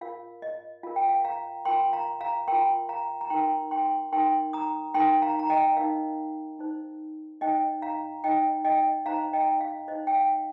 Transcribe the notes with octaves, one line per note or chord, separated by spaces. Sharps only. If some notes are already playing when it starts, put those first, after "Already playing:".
F4 A#4 F5
D#5
F4 A#4 F5
G5
F5
F5 A#5
F4 A#4 G5 C6
F5 A#5
F5 A#5
F4 A#4 G5 C6
F5 A#5
A#5
D#4 A#4 G5 C6
G5 C6
D#4 A#4 G5 C6
A#5 D#6
D#4 A#4 G5 C6
F5 A#5
A#5
D#5 G5
D#4 A#4 F5
D#4 C5
D#4 C5 D#5 G5
F5 A#5
D#4 C5 D#5 G5
D#5 G5
D#4 C5 F5 A#5
D#5 G5
F5
D#4 C5 D#5
G5
F5